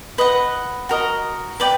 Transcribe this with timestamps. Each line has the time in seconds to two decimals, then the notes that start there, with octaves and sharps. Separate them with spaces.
0.18 B4 D#5 F#5
0.89 F#4 A#4 D#5
1.60 B4 D5 G5